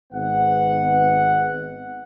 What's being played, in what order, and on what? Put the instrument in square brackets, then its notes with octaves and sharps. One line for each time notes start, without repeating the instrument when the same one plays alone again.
[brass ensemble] G#1 B3 F#5